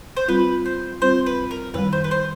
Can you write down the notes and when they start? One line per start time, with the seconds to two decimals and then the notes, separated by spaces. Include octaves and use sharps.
0.16 C5
0.28 G3 C4 F4 B4
0.65 C5
1.01 G3 C4 F4 C5
1.26 B4
1.51 A#4
1.74 F#2 D#3 G3 B4
1.93 C5
2.04 B4
2.11 C5